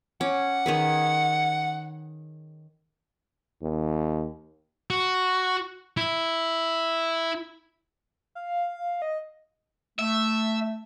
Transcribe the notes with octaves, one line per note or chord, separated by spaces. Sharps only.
C#4 F#5 D6
D#3 G#4 B4
D#2
F#4
E4
F5
D#5
A3 E5